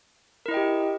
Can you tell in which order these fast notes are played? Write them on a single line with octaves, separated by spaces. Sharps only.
A#4 E4 D#5 G5 G4